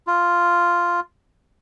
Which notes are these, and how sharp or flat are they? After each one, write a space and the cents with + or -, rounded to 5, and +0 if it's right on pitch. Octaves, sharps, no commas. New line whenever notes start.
F4 -5